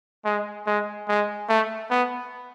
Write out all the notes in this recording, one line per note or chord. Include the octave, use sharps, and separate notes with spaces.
G#3
G#3
G#3
A3
B3